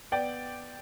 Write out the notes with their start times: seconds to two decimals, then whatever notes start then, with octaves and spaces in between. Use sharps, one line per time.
0.12 B3 D5 G5